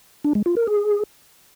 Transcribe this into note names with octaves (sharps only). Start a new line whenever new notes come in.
D4
G#3
F4
A#4
G#4